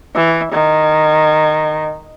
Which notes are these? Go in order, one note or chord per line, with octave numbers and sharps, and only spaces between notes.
E3
D#3